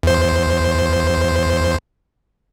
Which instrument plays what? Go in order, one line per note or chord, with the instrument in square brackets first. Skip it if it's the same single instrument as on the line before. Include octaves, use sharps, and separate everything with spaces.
[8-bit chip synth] E2 C5